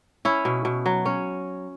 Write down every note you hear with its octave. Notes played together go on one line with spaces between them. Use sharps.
C#4 E4
B2
B2
F#3
C#4